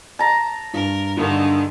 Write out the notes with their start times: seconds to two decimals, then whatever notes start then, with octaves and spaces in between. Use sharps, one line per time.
0.19 A5 A#5
0.74 G2 A#4
1.17 G2 D3 D#3 G#3